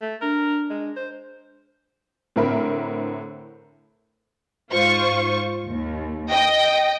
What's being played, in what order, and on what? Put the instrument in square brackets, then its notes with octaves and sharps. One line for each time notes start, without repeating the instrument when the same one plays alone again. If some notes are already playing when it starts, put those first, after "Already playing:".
[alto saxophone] A3
[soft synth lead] D4 [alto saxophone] A#4
[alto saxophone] G#3
C5
[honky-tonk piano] A2 D3 C4 A#4 E5 B5
[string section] G#2 F4 C5 C#6
D#2
D#5 G5